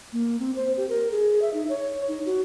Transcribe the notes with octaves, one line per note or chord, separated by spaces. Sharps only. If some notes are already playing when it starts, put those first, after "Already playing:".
A#3
C4
C5
G4
A#4
G#4
E5
D#4
C#5
D#4
F#4